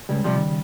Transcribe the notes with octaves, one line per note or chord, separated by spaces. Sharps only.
C#2 G3
C3 F3 G3
D#3
C#3